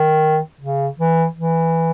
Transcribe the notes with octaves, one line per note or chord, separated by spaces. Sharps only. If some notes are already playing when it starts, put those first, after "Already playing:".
Already playing: D#3
C#3
E3
E3